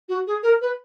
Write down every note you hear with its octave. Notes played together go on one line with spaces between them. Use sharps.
F#4
G#4
A#4
B4